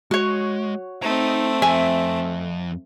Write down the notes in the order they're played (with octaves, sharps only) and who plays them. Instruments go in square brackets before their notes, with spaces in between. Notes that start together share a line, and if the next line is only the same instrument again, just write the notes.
[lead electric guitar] G#3 [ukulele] F#4 C#5
[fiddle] A3 C4 [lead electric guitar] D#4 A#5
[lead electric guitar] F2 [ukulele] E5 G#5